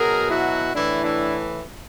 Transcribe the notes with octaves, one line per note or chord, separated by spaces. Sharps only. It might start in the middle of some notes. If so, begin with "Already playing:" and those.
Already playing: B2 F#3 G#4 A#4
E4 F#4
A2 E3 D4 E4
D4 E4